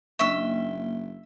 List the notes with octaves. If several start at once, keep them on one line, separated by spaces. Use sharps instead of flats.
F#1 A#3 D4 E5 C#6 E6 G7